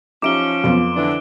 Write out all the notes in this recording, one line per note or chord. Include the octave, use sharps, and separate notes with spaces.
F3 C#4 D#4 G4 E5 D6 D7 G7
F2 B3 F4
D3 E3 D4